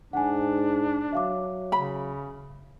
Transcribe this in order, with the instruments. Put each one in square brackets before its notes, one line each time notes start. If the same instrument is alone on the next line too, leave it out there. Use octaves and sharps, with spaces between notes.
[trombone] G#2 [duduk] D4 [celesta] F#5 G#5
[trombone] F#3 [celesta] E5 F5 D6
[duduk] C#3 [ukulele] B5